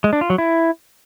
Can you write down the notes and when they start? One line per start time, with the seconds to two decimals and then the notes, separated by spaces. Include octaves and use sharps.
0.04 G#3
0.13 D4
0.21 F4
0.30 F#3
0.38 E4